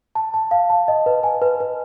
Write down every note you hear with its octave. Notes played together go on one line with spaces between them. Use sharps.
A5
A5
F5
A5
D#5
B4
G#5
B4
B4